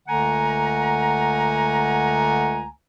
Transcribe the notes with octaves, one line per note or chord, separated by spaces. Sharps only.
C#2 D3 A3 F#5 G#5 A#5